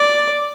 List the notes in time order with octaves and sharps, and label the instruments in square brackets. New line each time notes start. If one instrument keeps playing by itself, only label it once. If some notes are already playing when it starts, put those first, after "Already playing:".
Already playing: [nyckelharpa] D5